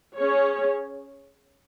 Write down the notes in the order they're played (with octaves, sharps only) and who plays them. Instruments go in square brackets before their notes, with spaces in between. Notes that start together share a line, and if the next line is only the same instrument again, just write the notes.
[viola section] C#4 G#4 C#5